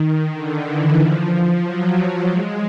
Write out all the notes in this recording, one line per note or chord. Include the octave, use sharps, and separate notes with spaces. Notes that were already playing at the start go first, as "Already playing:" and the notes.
Already playing: D#3
D3
E3
F3
F#3
G#3